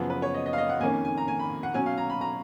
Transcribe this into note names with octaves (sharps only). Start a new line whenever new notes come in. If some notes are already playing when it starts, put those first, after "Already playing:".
Already playing: F#2 C#3 F3 B3
B4
C#5
D#5
D#5
F5
D#5
F#5
F2 D#3 A#3 C#4 G#5
G#5
A#5
G#5
B5
F#5
B2 F#3 C#4 G#5
F5
A#5
B5
A#5